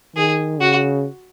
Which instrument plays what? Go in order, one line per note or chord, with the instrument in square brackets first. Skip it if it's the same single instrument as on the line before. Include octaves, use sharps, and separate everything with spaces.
[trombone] D#3 [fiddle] G#4
[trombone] C#3 [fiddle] F#4